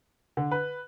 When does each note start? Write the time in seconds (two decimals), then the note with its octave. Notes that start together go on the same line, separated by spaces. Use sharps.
0.37 D3
0.51 B4